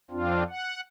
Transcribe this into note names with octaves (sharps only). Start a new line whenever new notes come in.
F2 C4 D4 F4
F#5